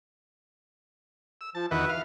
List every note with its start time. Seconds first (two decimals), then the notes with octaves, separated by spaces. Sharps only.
1.41 E6
1.55 F3 A5
1.71 E2 D#3 F#4 B4 E5
1.90 F5